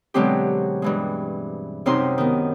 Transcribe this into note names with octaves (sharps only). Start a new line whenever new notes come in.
B2 D3 F#3 G#3 C4 G4
G2 E3 G#3
F#2 C3 C4 D#4 C6
D#3 B3